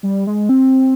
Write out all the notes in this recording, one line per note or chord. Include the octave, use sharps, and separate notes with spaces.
G3
G#3
C4